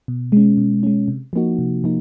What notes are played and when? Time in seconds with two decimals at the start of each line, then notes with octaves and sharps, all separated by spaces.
0.08 B2
0.32 G#3 C#4
0.58 B2
0.83 G#3 C#4
1.08 C3
1.33 F3 A#3 D#4 F#4
1.59 C3
1.84 F3 A#3 D#4